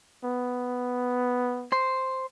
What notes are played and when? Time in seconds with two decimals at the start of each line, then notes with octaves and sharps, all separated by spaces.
0.24 B3
1.72 C5